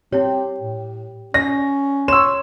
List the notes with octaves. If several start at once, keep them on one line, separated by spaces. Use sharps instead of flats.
C4 E4 G4 C#5
A2
C#4 D5 A#6
C#5 C6 E6 E7